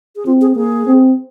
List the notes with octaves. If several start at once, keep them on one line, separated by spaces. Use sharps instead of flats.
G#4
C4 F4
G#4
A#3 G#4
C4